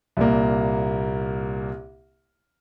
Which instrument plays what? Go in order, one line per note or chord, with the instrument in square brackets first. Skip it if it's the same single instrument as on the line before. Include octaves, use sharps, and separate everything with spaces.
[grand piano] C2 A#2 A#3